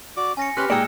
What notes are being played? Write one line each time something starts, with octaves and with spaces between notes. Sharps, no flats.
F#4 D5 D6
C#4 G#5 A#6 C#7
C#4 G4 B4 B5 C6 F6 F#6
A#2 G#3 D#4 D5 G5 E6 C#7 E7